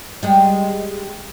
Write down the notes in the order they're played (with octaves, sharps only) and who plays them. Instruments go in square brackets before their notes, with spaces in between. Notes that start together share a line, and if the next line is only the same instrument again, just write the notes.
[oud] G3 G#3